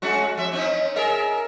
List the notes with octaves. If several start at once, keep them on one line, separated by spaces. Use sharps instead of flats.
G#3 C#4 F#4
F2 E5
C4 C#4 D#4
G#4 A#4 E5